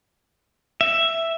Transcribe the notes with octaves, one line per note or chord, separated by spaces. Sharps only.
E5